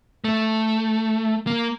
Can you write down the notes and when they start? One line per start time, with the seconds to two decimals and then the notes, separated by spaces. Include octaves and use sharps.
0.24 A3
1.47 A#3